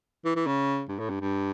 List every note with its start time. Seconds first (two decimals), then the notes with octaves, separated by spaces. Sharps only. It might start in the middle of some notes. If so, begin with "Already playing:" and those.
0.25 E3
0.36 E3
0.46 C#3
0.89 G2
0.99 A2
1.10 G2
1.20 G2